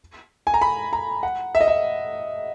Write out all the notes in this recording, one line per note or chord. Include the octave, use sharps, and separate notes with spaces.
G#5
A#5
B5
A#5
F#5
E5
D#5
E5